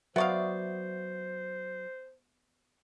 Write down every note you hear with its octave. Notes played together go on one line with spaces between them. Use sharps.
F#3 B3 C5 D5 E5 F5 C#6 D#6